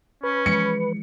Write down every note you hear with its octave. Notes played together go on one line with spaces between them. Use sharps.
C#4 B4
E3 F3 G#3 C#7